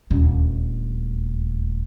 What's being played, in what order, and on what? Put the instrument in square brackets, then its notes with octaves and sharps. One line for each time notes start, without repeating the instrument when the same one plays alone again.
[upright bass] D#1 D2